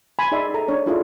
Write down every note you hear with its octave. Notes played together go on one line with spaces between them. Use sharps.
G#5 B5 C6
D#4 G#4 D5 E5 A5 C6
A4 A#5
D4 C#5
D4 E4 F4 G#4 A4 E5